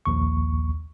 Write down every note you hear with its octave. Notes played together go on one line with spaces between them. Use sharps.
A#1 D#2 C#6